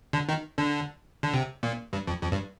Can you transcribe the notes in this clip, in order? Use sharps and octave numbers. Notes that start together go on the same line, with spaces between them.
D3
D#3
D3
D3
C3
A#2
G2
F2
F2
G2